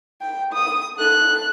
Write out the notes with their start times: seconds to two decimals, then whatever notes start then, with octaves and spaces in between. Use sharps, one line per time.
0.21 G5
0.53 D#6
0.97 A4 F#6